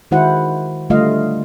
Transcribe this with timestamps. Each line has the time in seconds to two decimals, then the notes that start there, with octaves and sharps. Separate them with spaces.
0.11 D#3 G#3 E4 F#4 C5 F#5
0.90 D3 G3 A3 F4 D#5 F5